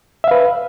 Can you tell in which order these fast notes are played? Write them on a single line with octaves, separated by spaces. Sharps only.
E5 F5 B4